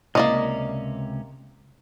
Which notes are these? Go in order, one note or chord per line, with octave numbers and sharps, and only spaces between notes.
C#2 C3 A#3 C#4 D5 D#5